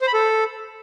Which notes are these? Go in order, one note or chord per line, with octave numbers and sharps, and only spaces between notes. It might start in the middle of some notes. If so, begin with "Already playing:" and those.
C5
B5
A4